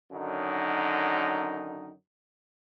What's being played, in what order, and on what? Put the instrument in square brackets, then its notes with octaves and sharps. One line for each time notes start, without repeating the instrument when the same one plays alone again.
[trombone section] F#2 D3 D#3 F#3 D#4